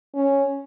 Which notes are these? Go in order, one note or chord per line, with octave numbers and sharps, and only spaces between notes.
C#4